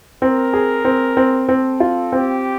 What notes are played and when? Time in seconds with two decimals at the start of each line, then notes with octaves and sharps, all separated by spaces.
0.21 C4 A#4
0.53 G#4
0.85 C4
1.17 C4
1.49 C4 A4
1.80 F4
2.12 C4 G4